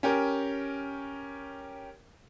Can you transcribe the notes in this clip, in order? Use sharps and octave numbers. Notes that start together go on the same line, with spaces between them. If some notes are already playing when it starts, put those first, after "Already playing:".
C#4 G4 A#4